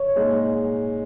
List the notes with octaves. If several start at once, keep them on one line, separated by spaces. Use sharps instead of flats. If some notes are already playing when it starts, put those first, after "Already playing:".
Already playing: C#5
A#2 G#3 D#4